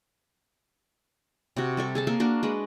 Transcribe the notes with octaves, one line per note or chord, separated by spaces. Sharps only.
C3 F#4
G3 A4 E5
G#4 A4 A5
A#3 A4 E5
A#3 D4 F#4
G#3 D4 B4